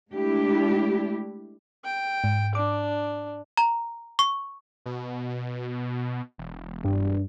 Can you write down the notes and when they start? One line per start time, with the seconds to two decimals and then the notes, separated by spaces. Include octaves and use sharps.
0.12 G#3 A3 D4 E4 G4
1.84 G5
2.24 G#2
2.55 D4 D6
3.57 A#5
4.19 C#6
4.86 B2
6.38 E1
6.84 G2